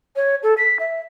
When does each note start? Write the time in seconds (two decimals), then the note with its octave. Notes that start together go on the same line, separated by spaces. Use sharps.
0.16 C#5
0.43 A4
0.58 B6
0.79 E5